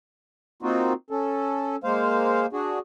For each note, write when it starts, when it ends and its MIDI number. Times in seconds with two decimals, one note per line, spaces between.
0.63 0.93 58
0.63 0.93 60
0.63 0.93 63
0.63 0.93 65
0.63 0.93 66
1.10 1.76 61
1.10 1.76 69
1.84 2.46 56
1.84 2.46 58
1.84 2.46 72
1.84 2.46 77
2.53 2.79 62
2.53 2.79 66
2.53 2.79 68